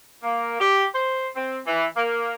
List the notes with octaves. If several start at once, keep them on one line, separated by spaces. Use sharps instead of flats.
A#3
G4
C5
C4
E3
A#3